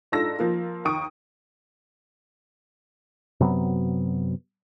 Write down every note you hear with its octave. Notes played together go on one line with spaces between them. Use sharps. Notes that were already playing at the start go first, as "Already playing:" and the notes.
G#2 D4 F4 A4 E6 A#6
F3 A#3 F4
D#2 C#6 D#6 D7
F#2 C3 F#3 B3